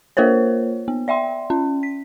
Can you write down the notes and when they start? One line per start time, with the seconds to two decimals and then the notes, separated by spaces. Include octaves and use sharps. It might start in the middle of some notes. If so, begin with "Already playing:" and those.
0.17 A#3 F4 A#4 C5 C#5
0.88 B3
1.08 D5 E5 G5 C6
1.50 C#4
1.83 B6